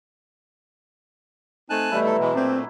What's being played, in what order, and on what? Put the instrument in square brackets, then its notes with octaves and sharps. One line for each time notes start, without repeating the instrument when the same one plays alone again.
[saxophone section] A3 C4 D#4 [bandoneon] G#5 A5 F#6
[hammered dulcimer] B2 E3 E4 [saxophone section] G3 A3
[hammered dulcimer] F#3 E4 [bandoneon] A4
[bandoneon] B2 E3 G#3
[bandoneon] A#2 A3 [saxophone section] C4 [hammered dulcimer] D4